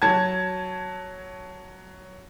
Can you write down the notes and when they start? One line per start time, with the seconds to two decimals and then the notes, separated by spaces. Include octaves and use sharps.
0.02 F#3 A5 G#6